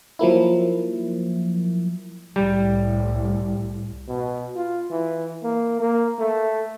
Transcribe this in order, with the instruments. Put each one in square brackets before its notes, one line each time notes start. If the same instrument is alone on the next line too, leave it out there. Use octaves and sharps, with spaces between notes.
[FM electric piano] F3 F#3 A#3 E4
[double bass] C2 A2 [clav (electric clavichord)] G3
[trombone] B2
F4
E3
A#3
A#3
A3